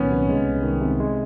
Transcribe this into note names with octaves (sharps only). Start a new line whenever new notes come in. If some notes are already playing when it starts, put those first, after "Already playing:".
Already playing: C2 A#2 D#3 F#3 B3 C#4
C3
G#3
C2
D#3
C3
G#3